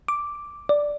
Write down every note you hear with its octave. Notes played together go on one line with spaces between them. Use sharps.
D6
D5